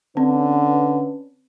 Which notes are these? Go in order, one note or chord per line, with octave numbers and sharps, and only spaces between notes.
D3 C4 C#4 B4